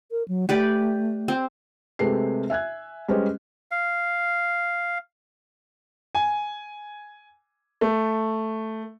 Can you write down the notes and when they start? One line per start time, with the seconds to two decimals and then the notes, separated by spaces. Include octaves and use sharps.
0.11 A#4
0.28 F#3
0.49 A3 G4 B4 D5
1.28 C4
1.99 C3 G#3 A3 G4 B4 C7
2.50 E5 G#5 F#6 G#6
3.08 G3 G#3 C#4 B4 C5 D#5
3.71 F5
6.15 G#5
7.81 A3